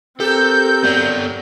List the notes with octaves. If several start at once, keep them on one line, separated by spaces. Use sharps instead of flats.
C4 G4 A4 A#4 G6
F#3 B3 A4 D5